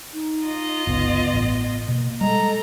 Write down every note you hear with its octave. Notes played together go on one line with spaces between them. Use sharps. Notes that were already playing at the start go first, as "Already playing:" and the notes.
D#4
F4 D#5
G1 C#2 B3
A1
B2 A#3
G3 G#3 A4 D#5 A#5